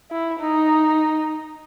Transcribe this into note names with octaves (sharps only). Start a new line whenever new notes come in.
E4
D#4